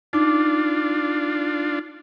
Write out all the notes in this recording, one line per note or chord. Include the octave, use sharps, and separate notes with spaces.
D4 D#4 F4 D6